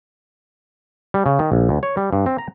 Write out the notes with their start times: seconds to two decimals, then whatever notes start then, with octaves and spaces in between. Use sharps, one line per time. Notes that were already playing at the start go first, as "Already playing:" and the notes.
1.14 G3
1.26 C#3
1.39 D#3
1.52 A#1
1.69 D2
1.83 C#5
1.97 G3
2.13 G2
2.26 C4
2.38 A#5